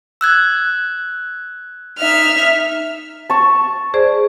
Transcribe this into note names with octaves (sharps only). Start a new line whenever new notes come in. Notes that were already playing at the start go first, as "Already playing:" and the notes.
E6 F#6 G#6
D#4 E5 F6
A5 C#6
G#4 C5 D5